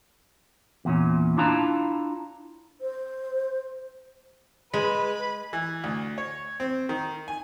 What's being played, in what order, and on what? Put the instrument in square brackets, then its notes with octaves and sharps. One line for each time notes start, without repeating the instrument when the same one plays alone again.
[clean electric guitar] E2 A#2 C#4
D4 E4 F4 A5 A#5
[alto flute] C5
[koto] G#3 [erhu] B4 [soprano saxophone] B5
[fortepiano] E3
D2
C#5
C4
D#3
G#5